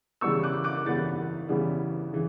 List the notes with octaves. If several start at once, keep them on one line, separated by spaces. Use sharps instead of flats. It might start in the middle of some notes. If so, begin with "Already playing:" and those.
C#3 E3 G3 B3 C#6 E6
D6 F#6
D6 F#6
C#3 E3 G3 B3 F#6 A6
C#3 E3 G3 B3
C#3 E3